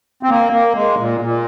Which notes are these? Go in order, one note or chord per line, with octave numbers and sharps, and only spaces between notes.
C4
A#3
A#3
G#3
A#2
A#2